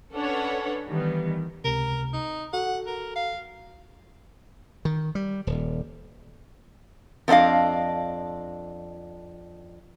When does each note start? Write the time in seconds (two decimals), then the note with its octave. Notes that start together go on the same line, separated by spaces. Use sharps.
0.13 C#4 D4 A4 B4 C#5 F#5
0.87 D#3 E3 G3 B3
1.64 C#2 C3 A#4
2.13 D#4
2.53 F#4 A4 F#5
2.87 A#4
3.15 F5
4.85 D#3
5.15 G3
5.47 D#1
7.28 F2 B3 D4 D#5 F5